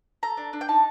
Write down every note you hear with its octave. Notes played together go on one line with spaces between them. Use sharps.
A4 A#5
D4
D4
G5
D#4 A5